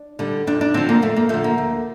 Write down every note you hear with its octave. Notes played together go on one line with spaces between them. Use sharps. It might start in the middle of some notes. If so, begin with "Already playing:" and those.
Already playing: D4
D3 G3
F2 D4
D4
D3 F3 C4
A#3
F2 A3
A#3
D3 F3 A3
A#3
D2